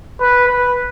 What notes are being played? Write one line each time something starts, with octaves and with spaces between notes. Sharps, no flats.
B4
B4